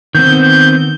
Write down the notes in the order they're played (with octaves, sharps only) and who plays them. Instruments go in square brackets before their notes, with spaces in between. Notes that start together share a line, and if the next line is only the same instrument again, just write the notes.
[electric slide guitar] D#3 B3 C4 [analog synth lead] G6